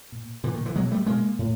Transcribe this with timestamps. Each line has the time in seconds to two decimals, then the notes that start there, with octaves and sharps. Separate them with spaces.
0.12 A#2
0.43 A#2 D3 E3
0.54 D#3
0.66 D3 E3
0.76 B2 F#3 G#3
0.91 G3 A3
1.06 B2 G#3 A#3
1.39 A2